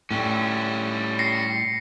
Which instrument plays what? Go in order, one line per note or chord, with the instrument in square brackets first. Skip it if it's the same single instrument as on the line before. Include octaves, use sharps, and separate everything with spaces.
[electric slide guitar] A2 [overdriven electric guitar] G3 C#4
[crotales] A#6 C7 C#7